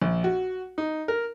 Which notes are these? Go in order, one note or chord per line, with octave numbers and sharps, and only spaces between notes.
A#1
F#4
D#4
A#4